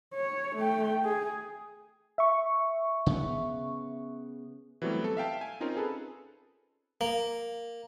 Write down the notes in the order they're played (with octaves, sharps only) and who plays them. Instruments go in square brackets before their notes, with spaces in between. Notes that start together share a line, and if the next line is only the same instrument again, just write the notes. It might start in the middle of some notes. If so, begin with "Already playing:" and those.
[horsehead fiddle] C#5
A3 G5
G#4
[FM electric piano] E5 C#6
[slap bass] C#3 B3
[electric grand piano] E3 F#3 G3 A3 B3 C4
A4
E5 F5 G5 A5
G#5
C4 C#4 D#4 F4 A#4
G#4 A4 B4
[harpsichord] A#3